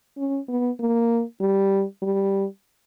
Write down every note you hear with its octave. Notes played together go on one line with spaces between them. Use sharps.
C#4
B3
A#3
G3
G3